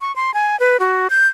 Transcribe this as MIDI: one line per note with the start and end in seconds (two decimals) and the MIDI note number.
0.01 0.14 85
0.16 0.34 84
0.34 0.59 80
0.60 0.77 71
0.80 1.08 66
1.10 1.27 91